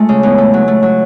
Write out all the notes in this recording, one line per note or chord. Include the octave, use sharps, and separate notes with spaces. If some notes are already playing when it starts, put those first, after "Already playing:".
Already playing: G#3 A3 F4
C#3
E2
A3
F#3
A3
F#3